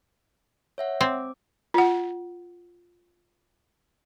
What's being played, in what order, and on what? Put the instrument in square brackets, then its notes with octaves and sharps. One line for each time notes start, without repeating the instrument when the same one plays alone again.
[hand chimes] C#5 E5 F#5
[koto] C4 [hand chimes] D6
[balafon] F4 F#5